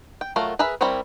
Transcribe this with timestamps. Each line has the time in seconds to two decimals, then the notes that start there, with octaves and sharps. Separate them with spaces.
0.21 G5
0.36 F#3 A3 F4 A#4
0.59 G#4 A#4 B4 E5
0.81 G3 C4 E4 A#4 C#5